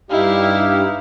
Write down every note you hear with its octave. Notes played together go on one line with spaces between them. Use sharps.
G2 D#4 E4 G4 F5